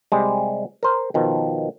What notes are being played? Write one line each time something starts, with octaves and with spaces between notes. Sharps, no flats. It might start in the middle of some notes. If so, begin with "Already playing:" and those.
C3 G3 G#3
A#4 C5
B2 D#3 F3